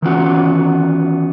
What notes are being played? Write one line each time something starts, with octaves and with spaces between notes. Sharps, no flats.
D#3 E3 B3 C#4 F4 F#4